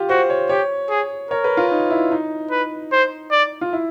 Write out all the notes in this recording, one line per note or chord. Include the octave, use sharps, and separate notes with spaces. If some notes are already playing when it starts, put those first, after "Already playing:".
Already playing: F4 G4
F#4 C5
C#5
G4 C#5
G#4
A#4 C#5
B4
F4
D#4
E4
D#4
B4
C5
D5
F4
E4